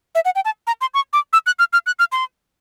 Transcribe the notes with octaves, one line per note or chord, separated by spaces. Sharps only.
E5
F#5
G5
A5
A#5
C6
C#6
D6
E6
F#6
F6
F6
F#6
F6
C6